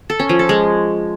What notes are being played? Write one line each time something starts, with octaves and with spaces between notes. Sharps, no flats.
A4
C#4
F3
A4
G#3